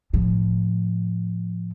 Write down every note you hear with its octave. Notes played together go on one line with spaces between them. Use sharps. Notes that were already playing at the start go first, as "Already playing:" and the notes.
A2 F3